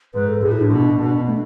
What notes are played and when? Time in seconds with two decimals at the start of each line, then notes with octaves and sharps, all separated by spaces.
0.14 G#2 B4
0.29 A4
0.42 A2 G#4
0.52 E4
0.61 D4
0.71 B2
0.99 B2
1.27 A3